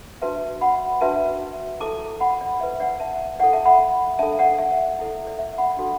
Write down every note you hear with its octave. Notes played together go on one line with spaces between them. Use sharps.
D4 F#4 B4 E5 A5
F#5 B5
D4 F#4 B4 E5 A5
E4 A4 A5 D6
F#5 B5
D5
E4 B4 E5
D5 F#5
E5 A5
E4 A4 D5 F#5
E5 A5
F#5 B5
D4 A4 E5 A5
D5 F#5
E5
E4 A4
D5
E5
F#5 B5
D4 F#4 A4